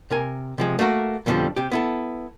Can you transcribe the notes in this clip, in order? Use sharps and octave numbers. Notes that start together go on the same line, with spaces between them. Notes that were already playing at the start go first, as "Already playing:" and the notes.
C3 A#4 G#5
C3 F3 G#3
A3 A#3 F#4 A#4
F2 B2 D3 D#3 F3 G3
C3 G4
B3 E4 A4